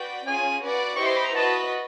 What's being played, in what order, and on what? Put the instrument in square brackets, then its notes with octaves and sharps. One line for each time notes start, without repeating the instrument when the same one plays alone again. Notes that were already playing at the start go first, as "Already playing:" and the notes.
Already playing: [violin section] F#4 B4 D5 G5
[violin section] C#4 F4 G#4 [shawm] G#5
[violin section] F#4 B4 D5 F#5
[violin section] E4 G4 C5 D#5 [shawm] C#6
[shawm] C6
B5
A#5
[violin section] F#4 B4 D#5 [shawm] A5